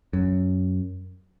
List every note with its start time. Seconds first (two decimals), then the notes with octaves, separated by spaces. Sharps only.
0.13 F#2